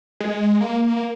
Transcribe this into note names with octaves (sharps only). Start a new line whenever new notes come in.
G#3
A#3
A#3